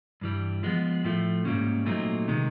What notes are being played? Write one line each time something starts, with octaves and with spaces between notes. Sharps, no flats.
G2 E3 G3
F3 G#3 B3
A2 F3 A3
G#2 E3 G3 A#3 C#4
A#2 F#3 A3 C4 D#4
C3 D#3 G#3